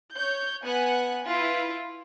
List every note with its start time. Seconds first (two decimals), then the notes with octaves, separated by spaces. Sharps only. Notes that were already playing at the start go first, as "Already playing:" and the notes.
0.14 C#5 G6
0.63 B3 F#5 G#5 F#6
1.24 E4 F4 B4